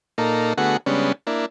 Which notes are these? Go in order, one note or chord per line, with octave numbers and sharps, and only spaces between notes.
A#2 A#3 D#4 A4
D3 A3 B3 F#4 G#4 F#5
C#3 G3 G#3 B3 C#4 D4
A#3 D4 E4